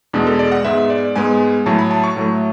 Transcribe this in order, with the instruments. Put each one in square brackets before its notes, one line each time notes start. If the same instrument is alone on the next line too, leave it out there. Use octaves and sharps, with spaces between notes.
[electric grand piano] E2 B2 G#3 D4
A4
D5
F#5
G#2 G#3 B3 E5
D5
G#2 G#3 B3 G#5
A2 F#3 A3 A5
B5
A5
C#6
A2 F#3 A3